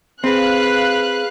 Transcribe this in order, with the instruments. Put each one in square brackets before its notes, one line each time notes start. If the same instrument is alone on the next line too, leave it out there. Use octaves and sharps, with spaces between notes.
[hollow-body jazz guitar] C4 [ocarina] G#4 [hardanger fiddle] B4 [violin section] F5 F#6